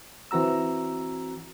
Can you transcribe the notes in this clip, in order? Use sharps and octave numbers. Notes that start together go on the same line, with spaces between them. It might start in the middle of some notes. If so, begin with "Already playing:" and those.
E3 C4 F#4 A#5 E6